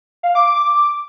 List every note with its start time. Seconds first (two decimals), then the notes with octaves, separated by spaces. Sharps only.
0.23 F5
0.35 D6
0.47 D6